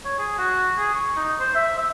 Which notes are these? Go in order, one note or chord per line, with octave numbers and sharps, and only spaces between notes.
C#5
G#4
F#4
G#4
C#6
D#4
C5
E5
E5